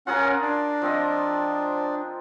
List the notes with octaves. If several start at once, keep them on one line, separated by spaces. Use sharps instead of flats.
C#4 F4 G#4 A#4 F#5
D4
F3 C4 D#5